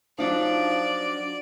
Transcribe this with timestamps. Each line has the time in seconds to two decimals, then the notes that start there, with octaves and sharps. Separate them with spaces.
0.19 F3 F#3 D4 D#4 D5